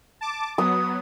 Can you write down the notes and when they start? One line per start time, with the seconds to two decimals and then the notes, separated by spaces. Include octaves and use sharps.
0.21 A5 D6
0.58 F#3 B3 D#6